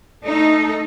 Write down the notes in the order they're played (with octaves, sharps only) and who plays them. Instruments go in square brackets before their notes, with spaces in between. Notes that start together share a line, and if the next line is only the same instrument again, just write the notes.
[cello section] A3 D#4 A4